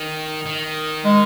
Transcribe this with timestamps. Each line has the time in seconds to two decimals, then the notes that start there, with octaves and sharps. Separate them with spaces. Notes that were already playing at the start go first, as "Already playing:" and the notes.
Already playing: D#3
0.46 D#3
1.05 G#3